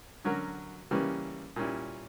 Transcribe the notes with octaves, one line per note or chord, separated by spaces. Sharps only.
D3 F#3 C#4 F#4 A#4
C#3 E3 G3 A#3 C#4
A#2 G3 C#4 E4